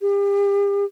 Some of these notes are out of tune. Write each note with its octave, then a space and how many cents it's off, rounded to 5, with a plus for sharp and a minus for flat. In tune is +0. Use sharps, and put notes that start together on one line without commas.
G4 +40